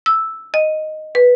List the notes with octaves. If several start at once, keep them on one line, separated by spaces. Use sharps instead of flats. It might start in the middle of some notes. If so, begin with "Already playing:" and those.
E6
D#5
B4